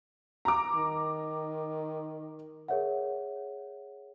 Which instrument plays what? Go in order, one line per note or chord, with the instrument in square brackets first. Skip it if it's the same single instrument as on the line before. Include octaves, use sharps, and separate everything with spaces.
[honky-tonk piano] A#5 D6
[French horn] D#3
[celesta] G#4 A#4 C#5 E5 F#5